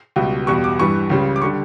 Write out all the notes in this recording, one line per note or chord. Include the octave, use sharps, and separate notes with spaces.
C#2 B2 G3
E2 B2 G3 C#6
D6
G2 E3 G3 C#6
C#2 C#3 G3
D6
D3 G3 C#6